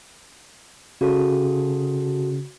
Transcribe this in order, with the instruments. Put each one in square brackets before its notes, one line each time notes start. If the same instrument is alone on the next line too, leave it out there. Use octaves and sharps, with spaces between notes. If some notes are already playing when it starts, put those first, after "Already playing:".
[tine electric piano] C#3 [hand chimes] F#4 A4